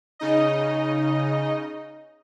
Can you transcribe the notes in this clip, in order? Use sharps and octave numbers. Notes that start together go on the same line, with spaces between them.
C#3 D#4 D#5